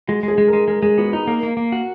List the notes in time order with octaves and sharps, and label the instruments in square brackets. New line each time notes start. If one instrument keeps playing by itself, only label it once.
[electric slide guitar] G#3 [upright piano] F#4
[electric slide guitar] G#3
[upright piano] G#4
[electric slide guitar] G#3
[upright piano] A#4
[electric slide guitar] G#3
[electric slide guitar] G#3 [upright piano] A#4
[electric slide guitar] G#3 [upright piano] G#4
[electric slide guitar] B3 [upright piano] F#4
[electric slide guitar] D#4 [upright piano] F#4
[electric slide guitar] A#3 [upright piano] A#4
[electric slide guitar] A#3
A#3
F#4